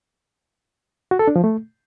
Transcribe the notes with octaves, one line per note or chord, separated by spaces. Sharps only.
F#4
A4
D4
F3
A3